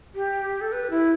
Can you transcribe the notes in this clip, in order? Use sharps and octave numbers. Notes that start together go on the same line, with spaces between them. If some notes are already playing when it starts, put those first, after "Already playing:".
G4
A4
B4
E4